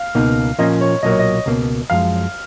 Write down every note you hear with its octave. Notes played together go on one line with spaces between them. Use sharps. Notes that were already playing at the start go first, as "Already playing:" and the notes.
Already playing: F5
C#2 B2 A#3 D#4
A#2 F3 A#3 C#4 D#5
C#5
B1 A#2 F#3 A#3 D#5
C#5
D#5
C#2 B2 A#3
F#2 F3 G#3 F5